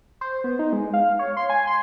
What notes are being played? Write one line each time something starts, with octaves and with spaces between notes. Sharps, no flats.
C5
B3
D#4
G#3
F5
C#5
C6
G#5
C6